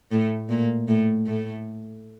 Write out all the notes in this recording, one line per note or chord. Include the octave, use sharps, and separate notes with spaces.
A2 A3
A#2 A#3
A2 A3
A2 A3